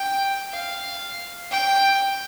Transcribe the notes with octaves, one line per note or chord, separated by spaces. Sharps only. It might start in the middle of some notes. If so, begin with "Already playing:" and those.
Already playing: G5
F5
G5